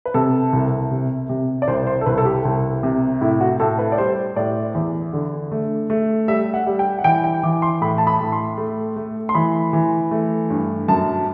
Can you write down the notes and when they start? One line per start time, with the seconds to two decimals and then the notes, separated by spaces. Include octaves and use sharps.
0.05 B4
0.14 C3 A4
0.53 C2
0.91 C3
1.29 C3
1.62 D5
1.68 C2 C5
1.87 C5
2.01 A4
2.06 C2 B4
2.18 A4
2.25 G4
2.45 C2
2.83 C3
3.21 A2 E4
3.41 F#4
3.60 A2 A4
3.79 B4
3.92 D5
3.98 G3 C5
4.36 A2 D5
4.75 E2
5.13 D3
5.52 A3
5.90 A3
6.28 G3 E5
6.54 F#5
6.67 G3
6.79 G5
6.99 F#5
7.04 E3 G5
7.24 G5
7.43 E3 D6
7.62 C6
7.81 A2 B5
7.98 A5
8.07 B5
8.20 A2
8.32 C6
8.58 A3
8.96 A3
9.29 C6
9.35 E3 B5
9.73 E3
10.11 A3
10.50 G2
10.88 F#2 A5